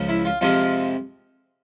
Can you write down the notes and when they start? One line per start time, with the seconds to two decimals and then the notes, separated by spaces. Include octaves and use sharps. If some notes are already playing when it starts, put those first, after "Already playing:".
Already playing: C#2 C#3 F3
0.09 E4
0.25 F4
0.41 F2 C3 F3 G#3 F4